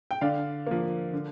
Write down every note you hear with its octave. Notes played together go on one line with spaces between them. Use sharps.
G5
D3 D5 F5
F3 A#3
D3